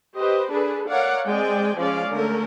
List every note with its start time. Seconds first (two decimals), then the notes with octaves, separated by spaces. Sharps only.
0.17 G4 B4 C5 D#5
0.50 D4 G#4 A4 B4
0.88 A#4 C#5 D5 F5 F#5
1.25 G#3 C4 D5 G5 G#5
1.78 F3 G#3 C#4 D5 F5
2.11 D3 A3 C#4 A4 A#4